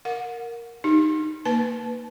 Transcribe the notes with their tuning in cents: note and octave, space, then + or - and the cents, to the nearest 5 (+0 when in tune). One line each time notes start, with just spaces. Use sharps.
A#4 +0 F#5 -35
D#4 -5 G4 +0
A#3 -10 B4 +0 A5 -20